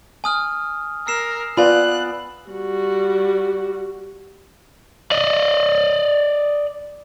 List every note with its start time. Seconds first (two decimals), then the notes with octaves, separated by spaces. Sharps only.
0.24 G#5 D#6 F6
1.07 A#4 E6 C7 E7
1.57 B3 F4 D5 G#5 B5 F#6
2.51 G3 F#4
5.11 D5 D#5